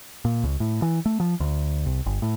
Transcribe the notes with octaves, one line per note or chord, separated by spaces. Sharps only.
A#2
C#2
A2
E3
A3
F3
D2
C2
G1
A2